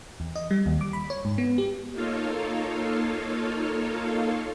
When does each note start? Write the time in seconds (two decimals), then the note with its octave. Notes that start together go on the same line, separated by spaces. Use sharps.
0.20 E2
0.36 D#5
0.51 G3
0.66 D#2
0.81 D6
0.93 B5
1.10 C#5
1.25 G#2
1.38 B3
1.58 G4
1.92 A#3 D#4 F4 A4 C#5 F5